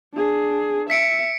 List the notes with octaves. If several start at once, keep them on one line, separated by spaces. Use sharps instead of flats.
D4 G#4
E5 B6 C#7 D7